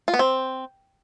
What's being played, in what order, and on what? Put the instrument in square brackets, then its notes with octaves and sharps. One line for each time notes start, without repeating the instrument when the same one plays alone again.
[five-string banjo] F4
B3
C4